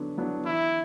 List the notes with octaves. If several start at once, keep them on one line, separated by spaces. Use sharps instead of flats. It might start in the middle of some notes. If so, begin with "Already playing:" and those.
Already playing: D3 F#3 B3 D4
F#3 B3 D4
E3 E4